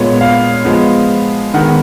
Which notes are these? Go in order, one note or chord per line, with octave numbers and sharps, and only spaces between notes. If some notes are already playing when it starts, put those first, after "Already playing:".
Already playing: A#2 G#3 B3 C#5
F5
F3 G#3 B3
D#3 G#3 B3 F#5